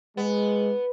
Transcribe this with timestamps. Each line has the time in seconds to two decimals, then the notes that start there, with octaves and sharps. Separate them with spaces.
0.17 G#3 B3